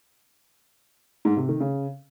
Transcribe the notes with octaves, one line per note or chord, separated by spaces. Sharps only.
G#2
C3
D#3
C#3